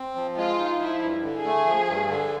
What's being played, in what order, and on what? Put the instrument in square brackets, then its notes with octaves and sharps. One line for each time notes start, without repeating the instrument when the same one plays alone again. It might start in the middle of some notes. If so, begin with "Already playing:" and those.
Already playing: [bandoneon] C4
F3
[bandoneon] G#3 [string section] F4
[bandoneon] D#4
[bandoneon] F3 [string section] E4
[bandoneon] G2
D3
[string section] G#4
[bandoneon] A3
F3
G2
D3